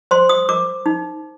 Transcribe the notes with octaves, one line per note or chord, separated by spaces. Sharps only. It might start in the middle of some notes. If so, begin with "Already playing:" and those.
C5 C6
D#6
A#4 D6
D#4